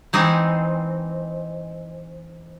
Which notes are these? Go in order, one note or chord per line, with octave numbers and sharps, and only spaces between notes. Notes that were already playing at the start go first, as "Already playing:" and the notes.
E3 G#3 C4 D#4